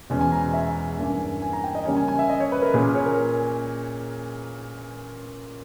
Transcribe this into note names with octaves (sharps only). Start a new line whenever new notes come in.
E2 B2 G#3 C#4
G#5
A#5
E5
G2 E3 A#3 C#4
G#5
A#5
G5
D#5
C#3 G3 A#3 C#4 C#5
G#5
G#5
E5
D#5
C#5
B4
A#4
A#2 A#3 C#4 G#4
C#5
A#4